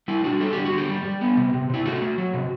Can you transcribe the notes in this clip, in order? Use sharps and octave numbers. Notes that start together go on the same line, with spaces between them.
G3 E4
D4 F#4
G3 A4
D3 G4
F#4
D3
G4
G3
G3
B3
C3
C3
C3 E4
A3 F#4
A3
F#3
C3